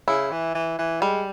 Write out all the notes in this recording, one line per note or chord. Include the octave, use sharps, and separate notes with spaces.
C#3 E4
E3
E3
E3
G3 G#3